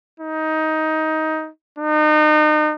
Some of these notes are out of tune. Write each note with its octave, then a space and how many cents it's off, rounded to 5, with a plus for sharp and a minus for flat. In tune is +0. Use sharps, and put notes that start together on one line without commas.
D#4 +15
D#4 -35